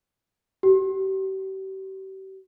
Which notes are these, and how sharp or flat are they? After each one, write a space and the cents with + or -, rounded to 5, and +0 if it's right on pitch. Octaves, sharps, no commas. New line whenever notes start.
G4 -40